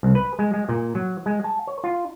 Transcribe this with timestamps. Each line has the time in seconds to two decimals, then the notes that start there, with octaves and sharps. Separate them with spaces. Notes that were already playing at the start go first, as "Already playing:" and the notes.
0.03 C2
0.15 B4
0.39 G#3
0.54 G#3
0.69 A#2
0.95 F#3
1.26 G#3
1.44 A5
1.67 C#5
1.84 F4